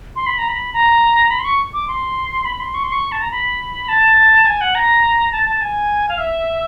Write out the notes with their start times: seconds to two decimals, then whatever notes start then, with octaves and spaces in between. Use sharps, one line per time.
0.16 C6
0.27 B5
0.38 A#5
0.48 B5
0.73 A#5
1.30 B5
1.39 C6
1.45 C#6
1.73 D6
1.88 C6
2.45 B5
2.60 C6
2.74 C#6
2.84 C6
2.92 C#6
3.12 A5
3.21 A#5
3.31 B5
3.89 A5
4.46 G#5
4.61 F#5
4.75 A#5
5.32 A5
5.46 A5
5.61 G#5
6.09 F5
6.18 E5